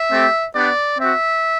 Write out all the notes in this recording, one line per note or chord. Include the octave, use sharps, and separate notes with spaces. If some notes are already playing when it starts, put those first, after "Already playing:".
Already playing: E5
A3 C4 G4
B3 D4 G4 D5
C4 F#4 E5